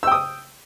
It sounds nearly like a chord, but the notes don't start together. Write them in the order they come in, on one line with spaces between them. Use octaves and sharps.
E6 G5 D#6